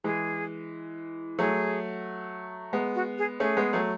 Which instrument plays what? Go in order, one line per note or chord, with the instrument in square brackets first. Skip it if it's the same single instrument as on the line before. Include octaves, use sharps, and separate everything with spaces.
[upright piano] E3 G#3 [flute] G#4
[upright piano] F#3 A3 [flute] G#4
[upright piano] G#3 B3
[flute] F#4
G#4
[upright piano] A3 C#4 [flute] G#4
[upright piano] G#3 B3
F#3 A3